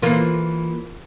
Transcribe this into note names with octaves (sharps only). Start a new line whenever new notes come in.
E3 A#3 F4